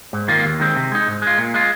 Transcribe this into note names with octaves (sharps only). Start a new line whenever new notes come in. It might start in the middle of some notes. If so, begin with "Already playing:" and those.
G#2
D#3 A#3 F4
D#2
D#3 G#3 C4
C3
G#3 D#4
G#2
G#3 F4
A#2
G#3 F4